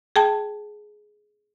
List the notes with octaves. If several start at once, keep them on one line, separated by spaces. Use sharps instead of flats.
G#4 G5 A5